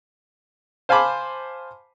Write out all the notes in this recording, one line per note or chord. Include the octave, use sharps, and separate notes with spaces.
C5 F5 G#5 A5 B5 D6